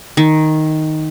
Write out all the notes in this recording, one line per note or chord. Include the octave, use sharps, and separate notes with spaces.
D#3